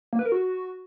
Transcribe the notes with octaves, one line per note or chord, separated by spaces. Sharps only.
A#3
B4
A#4
F#4